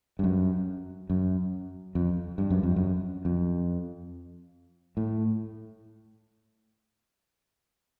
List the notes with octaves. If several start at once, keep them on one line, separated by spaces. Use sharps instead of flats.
G2
F#2
F#2
F2
G2
F#2
F2
F#2
F2
A2